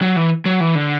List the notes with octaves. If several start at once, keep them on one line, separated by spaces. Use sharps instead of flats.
F#3
E3
F#3
E3
D3